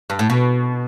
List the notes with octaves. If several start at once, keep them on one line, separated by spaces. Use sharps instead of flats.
G2
A2
B2